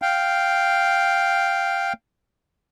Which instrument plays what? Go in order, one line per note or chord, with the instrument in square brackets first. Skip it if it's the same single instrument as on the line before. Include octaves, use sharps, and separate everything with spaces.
[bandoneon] F5 G5